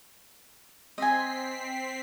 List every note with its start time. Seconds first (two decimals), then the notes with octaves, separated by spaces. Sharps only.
0.98 C4 D#5 G#5 B6 C7